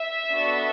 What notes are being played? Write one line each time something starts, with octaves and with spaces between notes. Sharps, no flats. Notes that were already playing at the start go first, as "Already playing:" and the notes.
Already playing: E5
B3 D4 F#4 A4